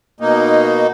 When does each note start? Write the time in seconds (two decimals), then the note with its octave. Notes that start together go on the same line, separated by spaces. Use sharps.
0.20 B2 A#3 D#4